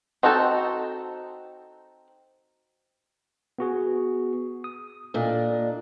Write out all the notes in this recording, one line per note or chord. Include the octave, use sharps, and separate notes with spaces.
C4 D#4 F#4 A4
B3 F#4 G#4
D#6
A#2 D4 A4 D#5